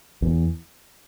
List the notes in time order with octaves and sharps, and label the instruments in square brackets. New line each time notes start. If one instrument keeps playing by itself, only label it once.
[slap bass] E2